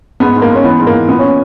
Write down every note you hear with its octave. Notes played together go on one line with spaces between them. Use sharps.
G#2 B3
G#2
A#3
G#2
C#4
E3 B3
G#2
A#3
E3
A#2 B3
A#2 C#4